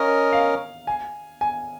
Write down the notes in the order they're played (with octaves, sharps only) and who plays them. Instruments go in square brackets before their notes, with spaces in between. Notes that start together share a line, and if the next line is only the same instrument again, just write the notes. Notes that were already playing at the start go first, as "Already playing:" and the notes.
Already playing: [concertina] C#4 A#4 D#5 [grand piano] F5
[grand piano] F5
G#5
G#5